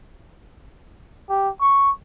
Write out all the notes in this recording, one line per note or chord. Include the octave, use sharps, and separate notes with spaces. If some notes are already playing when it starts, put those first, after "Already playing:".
G4
C#6